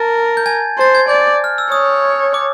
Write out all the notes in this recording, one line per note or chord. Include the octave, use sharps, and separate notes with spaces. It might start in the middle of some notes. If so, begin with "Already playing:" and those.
Already playing: A#4 A5 A6
G6
G#5 G#6
C5 A6
G#6
D5 G6
F6
E6
C#5 D#6
D6